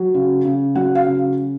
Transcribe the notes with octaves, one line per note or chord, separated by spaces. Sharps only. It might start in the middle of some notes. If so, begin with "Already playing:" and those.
Already playing: F#3
C#3
C#3
F#3 F#5
F5
C#3